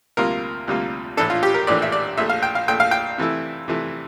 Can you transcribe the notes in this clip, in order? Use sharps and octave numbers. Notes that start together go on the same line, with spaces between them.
D2 C3 G3 A#3 F4 A#4
D2 C3 G3 A#3 F4
A#1 A2 E3 A3 D4 A4
F4
G4
A#4
A#1 A2 E3 A3 D4 D5
E5
D5
A#1 A#2 A3 E5
F5
G5
F5
A#1 A#2 A3 G5
F5
G5
C3 E3 A3 E4
C3 E3 A3 E4